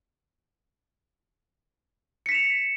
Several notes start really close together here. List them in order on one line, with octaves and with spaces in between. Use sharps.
C#7 B6 E7 F7